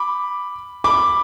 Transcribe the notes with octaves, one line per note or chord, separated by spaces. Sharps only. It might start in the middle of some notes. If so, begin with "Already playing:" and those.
Already playing: B5 D6
B5 D6